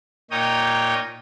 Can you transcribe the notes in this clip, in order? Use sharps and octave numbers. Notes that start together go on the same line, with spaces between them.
A#2 D#4 C#5 G5 A#5 D#6